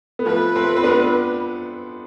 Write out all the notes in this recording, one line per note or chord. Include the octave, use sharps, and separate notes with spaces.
B3
F3 A3 B4
A3 C4
C4
B3 D4